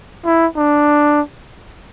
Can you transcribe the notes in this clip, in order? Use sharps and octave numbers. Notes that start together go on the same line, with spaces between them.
E4
D4